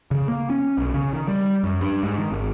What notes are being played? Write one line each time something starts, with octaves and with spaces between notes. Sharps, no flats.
C#3
A#3
C#4
B1
C#3
D#3
G3
F#2
G2
G#2
D#3
G#1